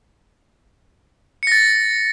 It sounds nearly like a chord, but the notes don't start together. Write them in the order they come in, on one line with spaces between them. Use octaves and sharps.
C#7 A#6 A6